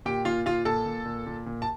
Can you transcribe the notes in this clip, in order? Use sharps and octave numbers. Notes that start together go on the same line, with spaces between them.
A#2 G4 G5
A#2 F4 F5
A#2 F4 F5
A#2 A4 A5
A#2
A#2
A#2
A#2
A5